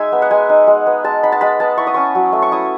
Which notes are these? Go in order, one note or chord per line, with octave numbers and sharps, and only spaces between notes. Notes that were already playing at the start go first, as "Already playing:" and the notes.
Already playing: G#3 D#4 E5 G#5
B3
F#5
G#3 G#5
D#4
G#3
B3
G#3 A5
D#4 B5
A5
G#3 B5
B3 A5
E4 C#6
D#6
C#4 C#6
F#3
A3
C#6
E4 D#6